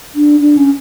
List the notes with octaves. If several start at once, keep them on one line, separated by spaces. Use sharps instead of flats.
D4
D4
C#4